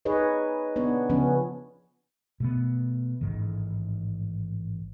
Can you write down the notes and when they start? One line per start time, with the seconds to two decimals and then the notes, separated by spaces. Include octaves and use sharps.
0.05 D#4 G#4 B4 C#5 D#5
0.76 B3 D4 C#5
1.09 C#3 F3 B3 C#4
2.40 B2 A3 B3
3.21 A1 G#2 D#3